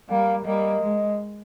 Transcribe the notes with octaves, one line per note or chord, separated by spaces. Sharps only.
G3 A#3 F5
G3 A#3 D#5
G#3